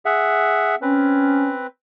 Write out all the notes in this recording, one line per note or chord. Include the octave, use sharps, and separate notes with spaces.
G#4 E5 F#5
C4 C#4 B4